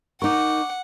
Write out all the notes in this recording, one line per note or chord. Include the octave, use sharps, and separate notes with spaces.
D#4 A#4 F#5 C#6 D6